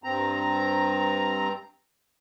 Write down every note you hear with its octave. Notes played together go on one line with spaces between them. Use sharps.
G2 C4 A#5